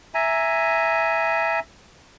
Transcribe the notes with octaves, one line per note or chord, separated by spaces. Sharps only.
E5 G#5 A#5